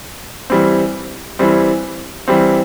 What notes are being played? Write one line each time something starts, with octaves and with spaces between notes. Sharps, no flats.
E3 G3 C4
E3 G3 C4
E3 G3 C4